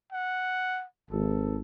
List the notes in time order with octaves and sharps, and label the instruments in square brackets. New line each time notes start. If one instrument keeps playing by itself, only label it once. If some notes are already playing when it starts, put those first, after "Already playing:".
[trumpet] F#5
[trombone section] G#1 [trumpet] A4